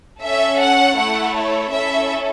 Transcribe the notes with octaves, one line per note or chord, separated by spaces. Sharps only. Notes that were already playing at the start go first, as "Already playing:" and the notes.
C#4 A4 E5
F#5
A3 E4 A4 F#5
C#5
C#4 E4 A4 E5